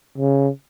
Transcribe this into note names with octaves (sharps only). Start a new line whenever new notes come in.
C#3